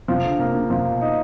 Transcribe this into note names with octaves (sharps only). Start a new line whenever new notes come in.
C3 F3
D3
C3 A#3
C#3
C3 F3
B2
D#4